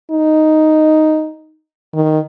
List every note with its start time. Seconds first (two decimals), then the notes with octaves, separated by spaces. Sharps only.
0.11 D#4
1.94 D#3